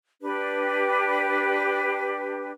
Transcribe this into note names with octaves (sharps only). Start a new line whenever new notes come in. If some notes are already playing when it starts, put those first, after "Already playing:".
D4 G4 B4